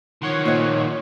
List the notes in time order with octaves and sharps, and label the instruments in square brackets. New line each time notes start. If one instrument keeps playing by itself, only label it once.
[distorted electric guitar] D#3 F3 [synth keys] C#5 F#5 C6
[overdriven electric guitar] A#2 [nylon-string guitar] A#3 C5 D#5